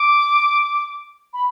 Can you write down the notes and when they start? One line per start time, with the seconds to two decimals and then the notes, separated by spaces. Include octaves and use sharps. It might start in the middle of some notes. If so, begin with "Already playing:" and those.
Already playing: D6
1.33 B5